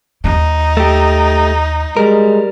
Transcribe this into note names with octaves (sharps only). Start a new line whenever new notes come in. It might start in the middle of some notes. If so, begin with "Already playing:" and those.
D#2 G3 D#4
A3 G4
G3 G#3 A#4